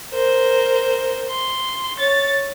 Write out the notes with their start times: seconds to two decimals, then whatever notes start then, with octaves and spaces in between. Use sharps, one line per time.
0.13 A#4 C5
1.30 C6
1.98 C#5 A6